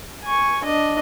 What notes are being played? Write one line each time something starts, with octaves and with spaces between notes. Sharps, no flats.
G#5 C#6
D4 D#5